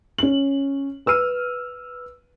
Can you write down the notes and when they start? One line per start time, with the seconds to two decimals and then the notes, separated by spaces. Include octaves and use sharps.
0.18 C#4 F#7
1.06 B4 E6 F6 D#7